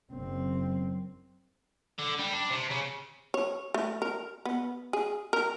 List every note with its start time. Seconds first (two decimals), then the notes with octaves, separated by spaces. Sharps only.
0.12 F#1 C4
1.99 D3
2.19 G3
2.33 D4
2.50 C3
2.70 C#3
3.34 C#5
3.74 A3
4.02 A#4
4.45 B3
4.93 G#4
5.33 A#4